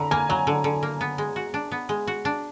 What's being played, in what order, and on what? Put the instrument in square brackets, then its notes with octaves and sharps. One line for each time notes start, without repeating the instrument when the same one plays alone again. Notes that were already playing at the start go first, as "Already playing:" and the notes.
Already playing: [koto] D3 [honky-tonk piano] A#5 B5
[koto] A#3 [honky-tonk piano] G#5
[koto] F#3 [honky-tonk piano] A#5
[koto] D3
D3
A#3
B3
G#3
F#4
D4
B3
G#3
F#4
D4